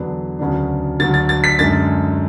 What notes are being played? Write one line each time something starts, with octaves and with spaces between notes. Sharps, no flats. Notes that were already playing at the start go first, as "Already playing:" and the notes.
Already playing: E2 D3 F#3 B3 D4
D2 C#3 F#3 B3 D4
D2 D3 F#3 A6
A6
A6
B6
F#2 D3 G#3 A6